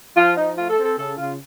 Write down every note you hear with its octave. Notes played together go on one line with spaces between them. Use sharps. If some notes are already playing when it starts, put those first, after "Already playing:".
F3 F4
F3 D#4
A3 F4
A4
C4
A4
C#3 A4
C#3 F4